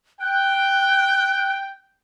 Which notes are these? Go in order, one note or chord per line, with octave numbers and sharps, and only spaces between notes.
G5 F#6